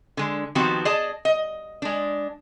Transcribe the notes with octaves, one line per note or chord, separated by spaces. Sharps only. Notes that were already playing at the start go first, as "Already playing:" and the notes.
D3 G#3
D#3 F3 B3 C4 F#4 G4
G#4 D5 D#5 A5
D#5
G#3 D4